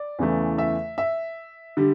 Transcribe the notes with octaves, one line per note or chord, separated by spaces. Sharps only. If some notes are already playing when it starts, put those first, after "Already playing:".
Already playing: D5
E2 C#3 E3 A3
E5
E5
D3 G3